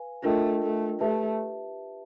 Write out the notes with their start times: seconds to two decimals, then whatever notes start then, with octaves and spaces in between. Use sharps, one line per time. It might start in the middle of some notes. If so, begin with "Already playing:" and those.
Already playing: B4 F5 G#5
0.23 A3 D4 F4 A#4 D#5 G5
0.62 A3
1.00 A3 G4 B4 E5 A5